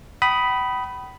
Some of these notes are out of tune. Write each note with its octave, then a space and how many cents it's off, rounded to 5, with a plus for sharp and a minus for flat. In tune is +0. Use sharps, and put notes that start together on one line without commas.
G5 -45 B5 +0 D#6 +5